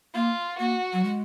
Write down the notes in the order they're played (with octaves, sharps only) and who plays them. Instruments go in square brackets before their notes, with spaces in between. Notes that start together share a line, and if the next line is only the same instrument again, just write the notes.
[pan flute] A#3 [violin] F4
[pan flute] A#3 [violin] F#4
[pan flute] F#3
G#3